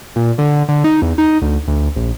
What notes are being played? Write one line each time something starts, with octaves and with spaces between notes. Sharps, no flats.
A#2
D3
D3
D#4
E2
D#4
D2
D2
A#1